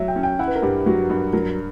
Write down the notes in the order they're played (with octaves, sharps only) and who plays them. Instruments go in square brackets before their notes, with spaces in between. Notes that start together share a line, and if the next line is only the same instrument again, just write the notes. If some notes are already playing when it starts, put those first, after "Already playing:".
Already playing: [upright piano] F#3 [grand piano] C#5 E5
[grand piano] G5
[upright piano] C#4
[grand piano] G5
[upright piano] E4 [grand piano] F#5
[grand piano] B4
A#4
[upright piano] G2 [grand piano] G4
[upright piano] F#3 [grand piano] F#4
[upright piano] G2
[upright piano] F#3 [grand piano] A#4